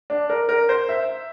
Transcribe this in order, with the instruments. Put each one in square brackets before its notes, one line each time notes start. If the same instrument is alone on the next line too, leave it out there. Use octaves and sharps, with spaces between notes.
[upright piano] D4
A#4
A#4
C5
E5